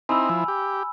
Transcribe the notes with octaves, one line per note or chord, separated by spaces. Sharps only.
C4 D#4 E4 G#5 B5 E6
F3 E4
G4